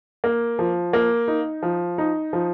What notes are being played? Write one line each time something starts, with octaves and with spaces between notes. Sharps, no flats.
A#3
F3
A#3
D#4
F3
D#4
F3